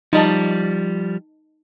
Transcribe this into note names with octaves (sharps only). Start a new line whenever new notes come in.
F3 G3 D#4 D#5 A5